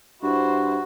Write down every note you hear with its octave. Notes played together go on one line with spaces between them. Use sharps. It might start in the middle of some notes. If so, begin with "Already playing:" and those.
G2 E4 F#4 C5